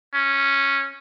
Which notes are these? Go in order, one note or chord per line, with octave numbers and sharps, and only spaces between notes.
C#4